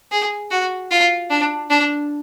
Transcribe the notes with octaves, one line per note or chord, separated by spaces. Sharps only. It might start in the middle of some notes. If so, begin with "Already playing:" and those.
G#4
F#4
F4
D4
D4